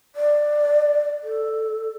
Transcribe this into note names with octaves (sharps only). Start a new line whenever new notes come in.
D5
A4